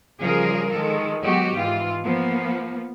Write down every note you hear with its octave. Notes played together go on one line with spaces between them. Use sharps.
C#3 F3 G3 G#4 A#4
D#3 G#3 A4
F#3 G#3 B3 F#4 G4
G#2 E3 F4
F3 A#3 B3